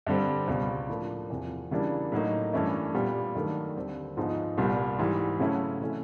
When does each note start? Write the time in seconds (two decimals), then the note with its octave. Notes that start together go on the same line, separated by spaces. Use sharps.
0.07 G2 D3 G3 C4
0.48 C#2 B2 G3
0.89 A2 F3 A#3 D4
1.30 E2 C3 F3
1.71 C#3 E3 G3 A#3 D4
2.12 A2 F#3 A#3 D#4
2.53 G2 E3 A3 C#4 E4
2.94 A#2 G3 B3
3.35 G2 D#3 F#3 A3
3.76 D#2 D3 G3 C4
4.17 G#2 F3 G#3 B3 D#4
4.57 C2 A#2 G3 B3
4.98 G#2 E3 G3
5.39 C#3 F#3 A3 C#4 E4
5.81 C3 E3 A3 C#4